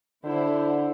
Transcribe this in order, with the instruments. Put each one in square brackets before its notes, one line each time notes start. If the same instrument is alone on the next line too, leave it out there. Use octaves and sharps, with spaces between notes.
[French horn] D3 [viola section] E4 C5